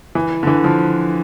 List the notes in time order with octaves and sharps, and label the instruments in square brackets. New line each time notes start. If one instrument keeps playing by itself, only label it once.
[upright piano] E3
D3
E3
F3